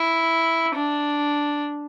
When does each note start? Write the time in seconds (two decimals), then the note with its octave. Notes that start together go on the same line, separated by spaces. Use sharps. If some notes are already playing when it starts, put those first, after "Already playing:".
Already playing: E4
0.76 D4